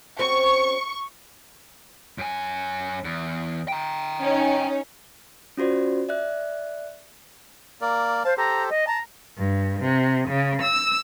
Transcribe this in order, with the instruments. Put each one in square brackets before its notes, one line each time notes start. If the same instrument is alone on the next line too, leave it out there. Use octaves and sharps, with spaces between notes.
[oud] C4 C#4 F#4 [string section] C#6
[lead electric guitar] F#2 G#5
E2
G5 A#5
[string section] C#4 D#4
[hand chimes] C#4 F4 F#4 C5 D5
D5 E5 F#6
[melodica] A#3 A#4 D5
[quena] C5 [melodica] F5 A5
[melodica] G4 A4 C5 [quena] A#5
[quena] D#5
[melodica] A5 [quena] A#5
[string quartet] G2
C3
C#3
E6